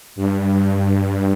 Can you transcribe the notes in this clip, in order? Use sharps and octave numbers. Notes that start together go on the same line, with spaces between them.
G2